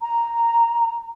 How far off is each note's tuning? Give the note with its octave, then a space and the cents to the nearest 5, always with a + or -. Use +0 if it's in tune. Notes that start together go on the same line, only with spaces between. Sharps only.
A#5 +0